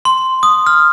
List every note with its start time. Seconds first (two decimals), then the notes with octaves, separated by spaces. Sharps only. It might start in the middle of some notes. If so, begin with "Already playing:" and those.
0.05 C6
0.43 D#6
0.67 F6